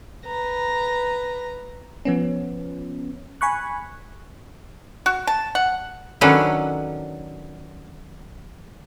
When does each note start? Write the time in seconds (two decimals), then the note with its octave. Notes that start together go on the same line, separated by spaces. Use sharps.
0.26 B4 A#5
2.05 F3 B3 C#4
3.41 G#5 B5 C#6 F#6
5.06 F#4
5.27 A5
5.55 F#5
6.21 D#3 F#3 C#4 D4 A4 B4